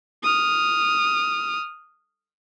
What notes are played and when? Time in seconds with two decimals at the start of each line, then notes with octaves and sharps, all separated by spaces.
0.23 D#6 F6